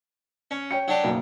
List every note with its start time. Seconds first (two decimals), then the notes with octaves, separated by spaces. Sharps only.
0.51 C#4
0.71 C#5 G5 C#7
0.88 F#3 D4 G4
1.03 F#1 B1 A#3